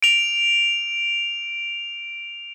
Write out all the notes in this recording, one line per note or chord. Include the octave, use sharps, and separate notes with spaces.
D7 F7